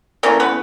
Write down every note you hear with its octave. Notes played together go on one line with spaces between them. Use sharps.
C#3 E3 A3 A#3 A#4
B3 B4